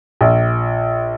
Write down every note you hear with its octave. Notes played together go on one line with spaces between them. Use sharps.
A#1